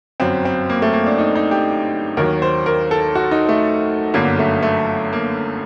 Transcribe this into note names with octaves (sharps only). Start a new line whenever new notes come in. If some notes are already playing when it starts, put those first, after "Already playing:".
G1 F#2 F#3 C4
C4
A#3
A3
A#3
D4
D#4
D#4
G4
D#2 D#3 F#3 A#4
C5
A#4
A4
F#4
D#4
A3
G1 F#2 D3 F#3 A#3
A3
A3
A#3